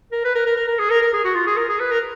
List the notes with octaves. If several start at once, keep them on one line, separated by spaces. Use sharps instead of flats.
A#4
B4
A#4
A#4
A#4
A#4
G#4
A#4
A#4
G#4
F#4
F4
G#4
A#4
G#4
B4
A#4